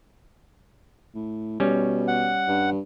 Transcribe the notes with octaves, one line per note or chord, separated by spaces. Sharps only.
A2
B2 G3 C#4
F#5
G2